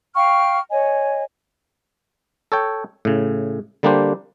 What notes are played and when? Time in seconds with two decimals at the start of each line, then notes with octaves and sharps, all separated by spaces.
0.15 F5 G5 C#6 F6
0.70 C#5 D#5 G#5
2.52 A4 C#5 G5
3.05 A2 C#3
3.83 D3 G3 A#3 D4 G4 C5